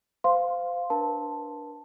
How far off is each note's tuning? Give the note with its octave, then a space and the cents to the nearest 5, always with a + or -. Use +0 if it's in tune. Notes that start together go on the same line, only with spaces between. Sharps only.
C5 -25 F5 +0 C6 +0
D4 +0 A#4 +45 A5 +0